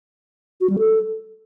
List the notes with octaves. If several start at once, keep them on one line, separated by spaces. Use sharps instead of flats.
F#4
G3
A4